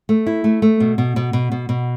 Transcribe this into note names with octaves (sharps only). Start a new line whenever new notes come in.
A3
E4
A3
A3
B2
B2
B2
B2
B2
B2